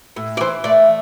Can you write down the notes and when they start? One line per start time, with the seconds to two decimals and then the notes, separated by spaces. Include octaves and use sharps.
0.16 A2
0.37 D5
0.40 E3 C5
0.64 A3 D5